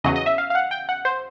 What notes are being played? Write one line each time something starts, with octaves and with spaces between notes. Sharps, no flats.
E2 C#3 F#3 D#5
D#5
E5
F5
F5
F#5
G5
F#5
C5